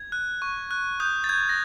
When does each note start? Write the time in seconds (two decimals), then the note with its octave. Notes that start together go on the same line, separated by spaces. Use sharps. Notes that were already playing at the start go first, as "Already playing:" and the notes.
Already playing: G#6
0.12 F#6
0.42 C#6
0.71 F#6
1.00 D#6 G6
1.24 A6
1.29 G6 G#6
1.49 A#6